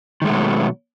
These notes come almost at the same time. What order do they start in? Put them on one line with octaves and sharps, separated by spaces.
D#3 G#3 A3 B2 F#3